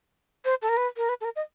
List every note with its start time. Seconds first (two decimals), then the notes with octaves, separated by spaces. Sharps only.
0.45 C5
0.62 A4
0.69 A#4
0.77 B4
0.97 A#4
1.09 B4
1.21 A4
1.25 A#4
1.36 D#5